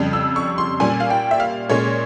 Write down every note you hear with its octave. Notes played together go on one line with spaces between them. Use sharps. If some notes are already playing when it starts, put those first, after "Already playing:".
Already playing: F2 C#3 G3
E6
C#6
C6
A#2 G3 C#4 G#5
F5
G5
E5
F5
A#2 G#3 C#4 C#5